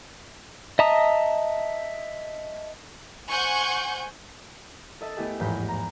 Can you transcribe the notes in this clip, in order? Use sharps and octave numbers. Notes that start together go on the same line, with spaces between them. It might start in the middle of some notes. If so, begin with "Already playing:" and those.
D#5 E5 A5 A#5 D#6
C5 F#5 G#5 C#6 G6
A4 D#5 E5 A5
A3 B3 E4 G4 G#4
A1 E2 G#2 F3 B5 G6
A#5